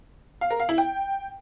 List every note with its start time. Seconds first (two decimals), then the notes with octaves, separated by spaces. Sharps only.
0.41 F5
0.51 A#4
0.60 F5
0.69 E4
0.78 G5